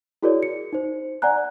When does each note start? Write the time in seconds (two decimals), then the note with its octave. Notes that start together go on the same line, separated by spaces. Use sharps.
0.23 E4 F#4 G#4 A#4 C#5 D5
0.43 C#7
0.73 D#4 C5
1.22 D5 F#5 G#5 A#5 F#6